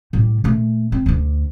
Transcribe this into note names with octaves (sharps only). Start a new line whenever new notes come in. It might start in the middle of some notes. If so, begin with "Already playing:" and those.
A2 G3
A#2 A3
C4
D2 D3